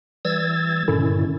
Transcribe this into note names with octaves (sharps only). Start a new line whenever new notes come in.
E3 G3 E6 G#6 A6
G2 A#2 D3 D#3 C#4 E4